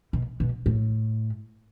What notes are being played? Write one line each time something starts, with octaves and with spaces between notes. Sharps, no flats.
B2
B2
A2